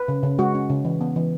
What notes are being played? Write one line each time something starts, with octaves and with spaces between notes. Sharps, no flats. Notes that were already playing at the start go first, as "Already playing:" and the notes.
Already playing: B4
C#3
C#3
G#3 F#4
C#4
C#3
E3
B3
E3